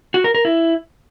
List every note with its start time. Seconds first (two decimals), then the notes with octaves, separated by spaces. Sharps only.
0.14 F#4
0.24 A#4
0.35 A#4
0.45 E4